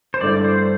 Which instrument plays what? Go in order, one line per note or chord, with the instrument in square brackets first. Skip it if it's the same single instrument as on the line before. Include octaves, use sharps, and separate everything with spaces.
[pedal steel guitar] C5
[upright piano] G1 G2 D3 A3 E4 [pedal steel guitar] D5
[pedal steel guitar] C5